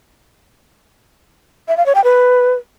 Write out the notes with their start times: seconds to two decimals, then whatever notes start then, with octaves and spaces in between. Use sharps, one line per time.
1.68 E5
1.77 F5
1.86 C#5
1.95 G5
2.04 B4